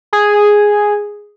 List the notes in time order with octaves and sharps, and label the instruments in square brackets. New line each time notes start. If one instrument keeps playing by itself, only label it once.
[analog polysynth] G#4